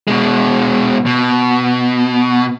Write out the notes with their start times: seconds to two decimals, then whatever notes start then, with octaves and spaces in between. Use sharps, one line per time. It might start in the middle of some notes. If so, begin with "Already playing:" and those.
0.08 B2 G#3
1.06 B2